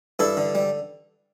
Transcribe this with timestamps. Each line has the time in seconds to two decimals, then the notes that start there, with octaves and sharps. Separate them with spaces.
0.19 G2 E4 A4
0.37 D3
0.55 G3